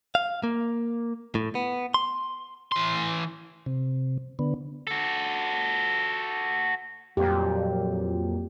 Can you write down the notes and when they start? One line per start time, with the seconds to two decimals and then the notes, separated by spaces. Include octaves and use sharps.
0.15 F5
0.43 A#3
1.35 A2
1.55 B3
1.94 C6
2.72 E3 C6
3.66 C3
4.39 D3 B3
4.87 F#4 A4
7.17 F2 A#2 F#3 G4